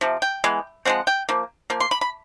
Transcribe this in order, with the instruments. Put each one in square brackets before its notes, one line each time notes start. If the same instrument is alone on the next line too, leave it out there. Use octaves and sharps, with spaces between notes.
[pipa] C3 F3
G5
E3 G#3 B3
F3 G#3 C4 F#5
G5
F3 A#3
F3 A#3
C6
B5
B5